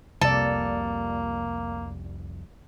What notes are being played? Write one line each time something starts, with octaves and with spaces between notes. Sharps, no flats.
C2 F2 C3 G3 A#3 A4 D5